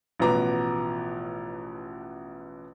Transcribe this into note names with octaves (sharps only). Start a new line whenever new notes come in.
A1 B2 F3 B3 A#5 D6